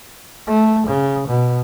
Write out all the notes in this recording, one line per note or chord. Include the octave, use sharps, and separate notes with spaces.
A3
C#3
B2